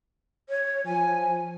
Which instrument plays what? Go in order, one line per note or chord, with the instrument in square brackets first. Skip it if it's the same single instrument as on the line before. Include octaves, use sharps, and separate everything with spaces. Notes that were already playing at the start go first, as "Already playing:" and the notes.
[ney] C#5
[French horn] F3 [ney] G#5